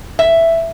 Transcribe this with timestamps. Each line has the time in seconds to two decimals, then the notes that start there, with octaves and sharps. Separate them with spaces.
0.19 E5